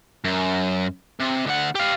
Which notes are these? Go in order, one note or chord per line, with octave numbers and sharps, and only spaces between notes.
F#2
C3
D2 F#5
G4 F5